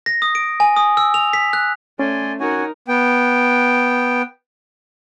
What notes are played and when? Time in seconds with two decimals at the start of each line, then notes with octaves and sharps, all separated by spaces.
0.06 A#6
0.22 D#6
0.35 D7
0.60 G#5
0.76 D#6
0.97 E6
1.14 F7
1.33 B6
1.53 F#6
1.99 A3 C#4 D5 G#5 C6
2.40 D#4 F#4 A#4 C#5 F#5 G#5
2.88 B3 G5